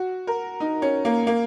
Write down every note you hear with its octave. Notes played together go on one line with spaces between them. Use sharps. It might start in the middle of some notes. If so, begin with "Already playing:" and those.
Already playing: F#4
A#4
D#4
C#4
A#3
A#3